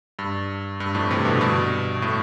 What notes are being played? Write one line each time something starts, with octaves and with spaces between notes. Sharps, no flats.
G2
G2
F2 A2
C3 E3
B2 D3
G2 B2
A2